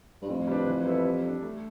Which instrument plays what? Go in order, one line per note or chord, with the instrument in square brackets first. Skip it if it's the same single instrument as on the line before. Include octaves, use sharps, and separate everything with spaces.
[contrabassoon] G2
[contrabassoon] F2 [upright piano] A2
[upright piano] G3 B3 D4
E3
G3 B3 E4 A4
G3
D4 A4
A3